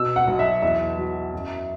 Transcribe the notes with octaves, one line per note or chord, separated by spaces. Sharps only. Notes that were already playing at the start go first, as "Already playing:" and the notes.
Already playing: B2 E6
F#5
B1
E5
E2 E5
F#3
F#2